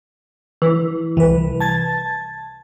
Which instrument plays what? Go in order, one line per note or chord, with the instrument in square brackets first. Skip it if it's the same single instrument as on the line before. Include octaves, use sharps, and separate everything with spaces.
[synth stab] E3
[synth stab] C2 [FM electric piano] E3 B4
[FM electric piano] A5 G#6 A6